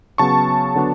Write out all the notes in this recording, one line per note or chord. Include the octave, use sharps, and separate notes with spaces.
C#3 F#3 B3 A5 C#6
D3 F#3 B3 D4